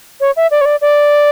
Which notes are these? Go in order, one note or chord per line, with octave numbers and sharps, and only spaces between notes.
C#5
E5
D5
C#5
D5
D5